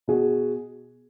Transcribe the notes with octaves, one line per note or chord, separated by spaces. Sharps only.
B2 F#4 G#4